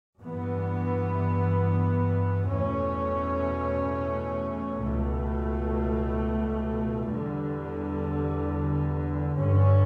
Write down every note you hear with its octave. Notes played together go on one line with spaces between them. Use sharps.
G2 E3 B3
E2 B2 A3 C#4
C#2 B2 A3
E2 D3 G3
G2 D3 G3 C#4